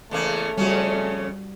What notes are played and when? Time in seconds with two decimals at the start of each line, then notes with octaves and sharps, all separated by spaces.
0.11 E2 C#3 A3 A#3
0.57 F2 C#3 G3 C#4 F#4